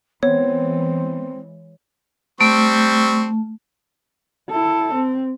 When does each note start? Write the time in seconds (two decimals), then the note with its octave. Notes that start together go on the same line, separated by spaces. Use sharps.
0.23 E3 G#3 B3 C4 C#5
2.41 G3 A3 C4 C#6
4.51 E4 A4
4.94 C4